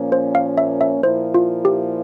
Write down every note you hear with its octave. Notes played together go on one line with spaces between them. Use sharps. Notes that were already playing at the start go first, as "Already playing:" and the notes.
Already playing: A#2 F3 A#3 C#4
C5
F5
E5
E5
A#2 F3 A#3 E4 C5
F4
G4